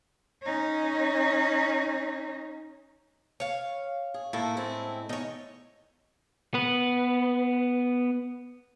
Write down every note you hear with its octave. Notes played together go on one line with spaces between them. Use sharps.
C#4 D#4
C#5 F5
G#4
A2 A#3 E4 A4
G#3 C4 E4
E2 D#4 C#5
B3 B4